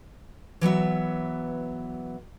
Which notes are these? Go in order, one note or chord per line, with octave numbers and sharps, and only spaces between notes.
E3 F#3 B3 E5